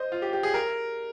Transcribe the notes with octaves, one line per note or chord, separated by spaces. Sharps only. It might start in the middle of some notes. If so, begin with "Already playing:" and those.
Already playing: C5 D#5
F4
G4
G4
G#4
A#4